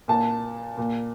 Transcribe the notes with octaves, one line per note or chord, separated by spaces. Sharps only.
A#2 A5
A#2